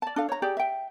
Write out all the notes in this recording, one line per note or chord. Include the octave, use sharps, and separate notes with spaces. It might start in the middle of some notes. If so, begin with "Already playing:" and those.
D5 A5
D4 A4 F5
C#5 A#5
G4 G#4 D5
E5 G5